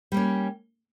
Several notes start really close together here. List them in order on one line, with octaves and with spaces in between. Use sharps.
G3 A#3 C#4